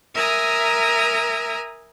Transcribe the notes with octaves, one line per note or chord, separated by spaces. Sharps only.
A#4 E5 G#5 A#5 D#6